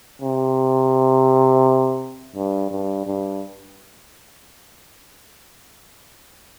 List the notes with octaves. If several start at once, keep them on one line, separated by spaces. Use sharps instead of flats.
C3
G2
G2
G2